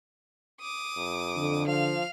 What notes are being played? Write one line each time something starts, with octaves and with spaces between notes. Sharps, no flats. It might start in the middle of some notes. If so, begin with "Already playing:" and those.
D6 D#6
F2
D3
F3 F5 F7